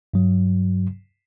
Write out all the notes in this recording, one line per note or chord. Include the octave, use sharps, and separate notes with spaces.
G2 F#3